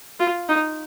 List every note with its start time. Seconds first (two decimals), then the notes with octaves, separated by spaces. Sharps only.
0.20 F4
0.49 D#4